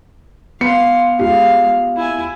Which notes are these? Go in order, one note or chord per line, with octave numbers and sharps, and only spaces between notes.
B3 F5 C6 C#7
G#3 F4 G4 F5
E4 G#5